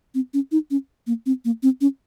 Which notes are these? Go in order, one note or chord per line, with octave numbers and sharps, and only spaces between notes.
C4
C#4
D#4
C#4
A#3
C4
A#3
C4
C#4